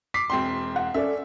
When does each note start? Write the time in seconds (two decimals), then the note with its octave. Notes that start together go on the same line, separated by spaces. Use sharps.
0.14 D6 B6 C7
0.30 E1 C4 C6
0.76 F#5
0.94 C#4 A4 D5 E5